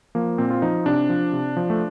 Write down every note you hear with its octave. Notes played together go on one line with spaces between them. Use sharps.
F3 A#3
A#2 C4
F4
F3 D#4
C3 D4
F3
C3
F3
A3